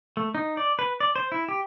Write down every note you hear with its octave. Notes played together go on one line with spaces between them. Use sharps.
A3
D#4
D5
B4
D5
C5
E4
G4